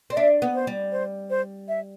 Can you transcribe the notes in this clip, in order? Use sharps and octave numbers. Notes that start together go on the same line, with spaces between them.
C4 D5
D4 E5
B3
C5
G3
C5
C5
E5